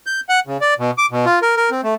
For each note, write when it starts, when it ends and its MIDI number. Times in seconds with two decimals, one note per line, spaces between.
0.06 0.20 91
0.29 0.40 78
0.47 0.57 49
0.61 0.74 74
0.79 0.91 47
0.98 1.06 86
1.11 1.25 47
1.26 1.39 65
1.42 1.56 70
1.57 1.70 70
1.71 1.81 60
1.83 1.95 57